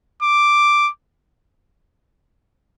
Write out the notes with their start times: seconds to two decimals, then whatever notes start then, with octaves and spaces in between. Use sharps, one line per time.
0.23 D6